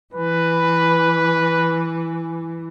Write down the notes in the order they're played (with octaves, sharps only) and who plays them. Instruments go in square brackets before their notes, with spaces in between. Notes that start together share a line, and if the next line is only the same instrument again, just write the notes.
[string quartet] E3 [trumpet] B4